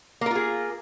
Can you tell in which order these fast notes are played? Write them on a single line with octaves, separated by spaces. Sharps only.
A#3 A#4 F4 G#4